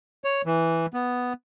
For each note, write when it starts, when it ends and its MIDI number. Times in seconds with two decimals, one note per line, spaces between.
0.24 0.42 73
0.46 0.86 52
0.94 1.33 59